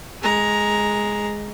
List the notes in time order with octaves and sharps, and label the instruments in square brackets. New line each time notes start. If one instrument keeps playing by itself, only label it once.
[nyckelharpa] G#3 A#5